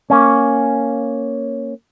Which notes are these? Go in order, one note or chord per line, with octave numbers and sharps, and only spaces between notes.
A#3 C#4